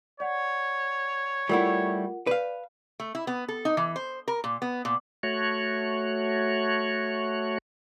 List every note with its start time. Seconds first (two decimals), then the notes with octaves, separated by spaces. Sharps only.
0.20 C#5 D5 F#5
1.49 G3 A3 E4 F4 A#4 F#5
2.27 B4 D5 F5
3.00 A3
3.15 E4
3.27 B3
3.48 A4
3.65 D#4
3.77 E3
3.96 C5
4.28 A#4
4.44 A#2
4.62 B3
4.85 A#2
5.23 A3 F#4 C#5